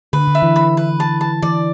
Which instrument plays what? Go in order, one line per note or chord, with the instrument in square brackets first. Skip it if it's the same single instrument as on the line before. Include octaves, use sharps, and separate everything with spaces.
[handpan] D3 [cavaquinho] B4
[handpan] D3
[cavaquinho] E5
[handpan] E3
[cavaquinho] B5
B4
A5
A5
[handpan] E3 [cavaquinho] D5